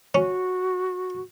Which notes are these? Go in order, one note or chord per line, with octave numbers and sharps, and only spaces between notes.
C#4 F#4